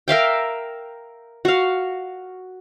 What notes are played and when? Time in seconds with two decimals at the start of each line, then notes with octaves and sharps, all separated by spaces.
0.08 A#4 E5 F5 G5
1.45 F#4 F5